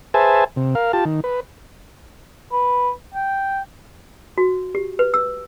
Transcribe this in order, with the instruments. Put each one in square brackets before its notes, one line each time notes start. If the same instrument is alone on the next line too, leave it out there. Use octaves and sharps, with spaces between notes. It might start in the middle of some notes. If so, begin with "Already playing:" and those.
[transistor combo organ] G#4 B4 C5 E5 G#5 A5
C3
A#4 F5
F4 G4 A5
D#3
B4
[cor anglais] B4
G5
[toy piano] F#4
G4
B4
E6